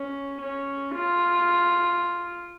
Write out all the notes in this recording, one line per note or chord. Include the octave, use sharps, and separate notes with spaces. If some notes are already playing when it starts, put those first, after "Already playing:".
Already playing: C#4
C#4
F4